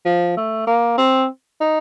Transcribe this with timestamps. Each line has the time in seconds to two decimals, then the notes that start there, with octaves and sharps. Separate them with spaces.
0.05 F3
0.37 A3
0.67 A#3
0.98 C4
1.60 D#4